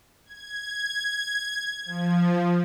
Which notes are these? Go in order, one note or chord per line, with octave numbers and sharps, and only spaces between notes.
G#6
F3